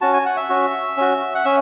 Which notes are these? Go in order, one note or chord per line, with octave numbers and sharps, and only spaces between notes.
C#4 F#4 A5
G#5
F#5
E5
C#4 F#4
C#4 F#4
F#5
C#4 E5